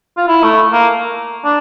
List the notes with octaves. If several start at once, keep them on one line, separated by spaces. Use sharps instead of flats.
F4
E4
A3
A#3
D4